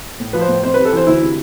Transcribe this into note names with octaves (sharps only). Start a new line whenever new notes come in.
A2
F3 B4
C5
A2
F2 C5
C3 B4
A4
E3 C5
D2 E4
C3